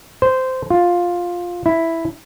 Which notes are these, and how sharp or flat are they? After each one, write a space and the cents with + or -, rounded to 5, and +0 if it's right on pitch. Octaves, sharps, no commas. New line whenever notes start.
C5 -15
F4 +10
E4 +0